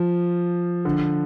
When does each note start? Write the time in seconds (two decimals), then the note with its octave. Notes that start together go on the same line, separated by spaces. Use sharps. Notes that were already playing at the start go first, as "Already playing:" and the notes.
Already playing: F3
0.85 D3